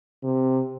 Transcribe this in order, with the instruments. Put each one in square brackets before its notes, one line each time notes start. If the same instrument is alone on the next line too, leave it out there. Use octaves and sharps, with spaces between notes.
[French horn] C3